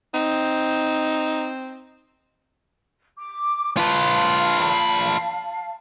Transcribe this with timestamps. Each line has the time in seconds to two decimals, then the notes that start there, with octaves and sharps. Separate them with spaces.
0.14 C4 D#4
3.17 D6
3.77 F4 B4 F5 A5